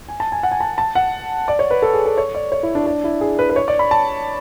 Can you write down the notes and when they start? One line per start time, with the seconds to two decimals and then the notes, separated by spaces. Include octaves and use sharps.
0.09 G#5
0.20 A5
0.32 G#5
0.43 F#5
0.51 G#5
0.61 A5
0.78 A5
0.95 F#5
1.48 D5
1.59 C#5
1.71 B4
1.82 A4
1.94 G#4
2.06 A4
2.18 C#5
2.35 D5
2.52 C#5
2.63 E4
2.75 D4
2.86 D4
3.04 E4
3.21 G#4
3.39 B4
3.50 B4
3.56 C#5
3.68 D5
3.79 B5
3.91 A5